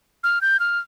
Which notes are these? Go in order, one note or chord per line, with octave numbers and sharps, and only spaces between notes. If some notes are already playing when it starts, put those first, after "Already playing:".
F6
G6
F6